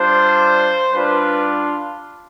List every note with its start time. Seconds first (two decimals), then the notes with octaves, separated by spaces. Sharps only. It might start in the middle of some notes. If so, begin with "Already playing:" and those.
Already playing: G3 D4 F4 C5
0.91 G3 D4 F4 B4